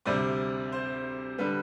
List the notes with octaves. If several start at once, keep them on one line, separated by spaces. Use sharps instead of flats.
D2 C3 G3 C4 D5
C5
D3 G3 B4